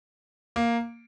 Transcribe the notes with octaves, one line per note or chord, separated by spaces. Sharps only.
A#3